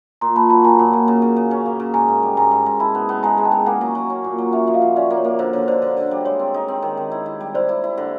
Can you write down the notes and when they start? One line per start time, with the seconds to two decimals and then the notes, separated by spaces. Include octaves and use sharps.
0.21 A#2 A#5 C6
0.36 A#2 A5 B5
0.50 F#3 A5 B5
0.64 A#2 G#5 A#5
0.79 A#2
0.93 A#2
1.08 C#3
1.22 C#3
1.36 C#3
1.51 C#4
1.66 A#3
1.80 C#3
1.94 G#2 G#5 A#5
2.08 G#2
2.23 G3
2.37 G#2 G#5 A#5
2.51 G#2
2.66 G#2
2.80 E4 A5 B5
2.95 B3
3.09 B3
3.23 G#3 G#5 A#5
3.38 G#3
3.45 G5 A5
3.52 B3
3.66 A#3 F#5 G#5
3.81 F#3
3.95 F#3
4.10 C#4
4.24 A#2
4.38 F#3
4.52 C#4 E5 F#5
4.67 F3 E5
4.74 D#5 F5
4.82 F3
4.96 C#4 D5 E5
5.10 A#3
5.17 C#5
5.24 A#3
5.39 D3 C5
5.53 D3 C#5
5.68 D3 C5 D5
5.82 D3 C5
5.97 D3
6.11 G3
6.25 G#3 C#5
6.39 C4
6.54 D#4
6.68 C4
6.82 D#3
6.97 D#3
7.11 E4
7.26 E4
7.40 G3
7.55 E4 C5 D5
7.69 E4
7.84 E4
7.98 D3